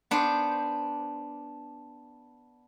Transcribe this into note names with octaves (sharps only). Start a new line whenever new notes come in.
B3 D4 C5